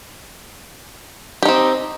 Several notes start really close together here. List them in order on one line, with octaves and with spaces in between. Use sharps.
G4 D#4 C4